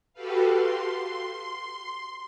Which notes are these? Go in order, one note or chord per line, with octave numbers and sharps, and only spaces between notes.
F#4 G4 A4 B4 F5
C6